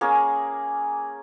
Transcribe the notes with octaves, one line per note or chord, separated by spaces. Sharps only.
A#3 C#4 G#4